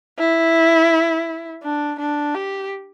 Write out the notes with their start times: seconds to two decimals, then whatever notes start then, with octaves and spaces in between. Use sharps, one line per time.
0.18 E4
1.63 D4
1.99 D4
2.35 G4